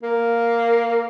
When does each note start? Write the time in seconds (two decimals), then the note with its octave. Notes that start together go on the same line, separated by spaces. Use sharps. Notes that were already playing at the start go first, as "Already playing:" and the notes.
0.03 A#3